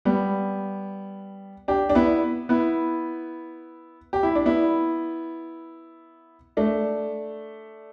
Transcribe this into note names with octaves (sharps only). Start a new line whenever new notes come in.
G3 B3
D4 G4
D4
B3 E4
B3 E4
G4
E4
D4
B3 E4
A3 D4